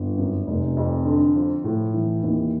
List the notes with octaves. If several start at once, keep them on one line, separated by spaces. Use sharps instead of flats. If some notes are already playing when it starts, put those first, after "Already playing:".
Already playing: G1
F#2
F1
F2
D3
F3
A2
E3
D#2